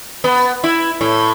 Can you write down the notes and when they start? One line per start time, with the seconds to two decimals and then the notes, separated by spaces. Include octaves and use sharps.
0.24 B3
0.64 E4
1.01 A2